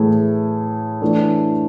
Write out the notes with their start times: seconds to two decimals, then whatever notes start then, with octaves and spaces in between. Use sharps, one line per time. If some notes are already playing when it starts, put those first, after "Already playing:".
Already playing: A2 E3 A3 E4 G#4
1.01 E3 A3 D4